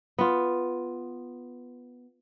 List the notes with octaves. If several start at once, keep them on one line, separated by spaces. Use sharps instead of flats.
B3 F4